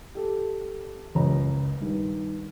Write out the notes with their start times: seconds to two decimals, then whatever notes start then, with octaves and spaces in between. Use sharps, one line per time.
0.15 G4 A4
1.15 F#1 C#2 C#5 A#5
1.81 G2 D#3